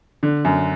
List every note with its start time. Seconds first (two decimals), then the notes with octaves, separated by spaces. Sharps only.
0.23 D3
0.45 F#2